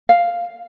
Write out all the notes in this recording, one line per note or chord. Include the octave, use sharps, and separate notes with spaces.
F5